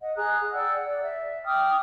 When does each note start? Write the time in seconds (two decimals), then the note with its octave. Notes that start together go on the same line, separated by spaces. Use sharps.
0.01 D#5 F#5
0.16 G#4 A#5 D#6 F#6
0.52 D5 F#5 G5 E6
0.85 D5
1.02 E5
1.46 G5 D6 D#6 F6